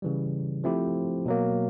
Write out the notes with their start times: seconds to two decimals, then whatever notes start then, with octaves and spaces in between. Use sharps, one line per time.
0.02 C#3 E3 G3
0.64 F3 A3 C4 E4 G4
1.26 B2 F#3 A#3